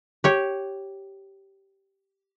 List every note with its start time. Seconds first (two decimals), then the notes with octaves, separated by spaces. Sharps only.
0.24 G4 C#5